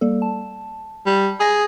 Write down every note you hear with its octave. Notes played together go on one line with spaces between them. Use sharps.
G3 A#3 A4
A5
G3
G#4 D#6 A#6